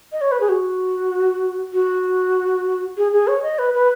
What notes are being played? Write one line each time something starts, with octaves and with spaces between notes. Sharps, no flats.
D#5
C#5
B4
G#4
F#4
F#4
G#4
G#4
C#5
D#5
B4
B4